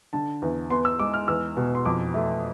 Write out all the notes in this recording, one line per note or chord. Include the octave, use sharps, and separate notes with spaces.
D3 A5
E2
B3 C6
E6
G#3 D6
F6
E2 E6
B2
C6
F2 D6
A3